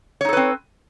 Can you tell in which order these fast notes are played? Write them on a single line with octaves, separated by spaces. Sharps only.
C#5 D#4 A4 B4 C4